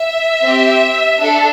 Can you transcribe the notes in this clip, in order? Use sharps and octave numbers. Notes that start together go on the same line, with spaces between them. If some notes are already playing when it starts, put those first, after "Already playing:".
Already playing: E5
C4 G4
D4 A4